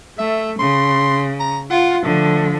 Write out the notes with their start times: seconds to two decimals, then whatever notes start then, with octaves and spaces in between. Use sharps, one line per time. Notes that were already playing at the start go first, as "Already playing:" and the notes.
0.18 A3 E5
0.59 C#3 C6
1.40 A#5
1.70 F4 F#5
2.04 D3 F3 A3